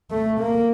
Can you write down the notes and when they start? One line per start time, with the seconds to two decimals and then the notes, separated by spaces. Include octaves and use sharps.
0.11 A3
0.40 A#3